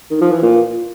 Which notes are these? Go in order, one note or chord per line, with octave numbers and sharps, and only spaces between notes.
D#3
F3
E3
A#2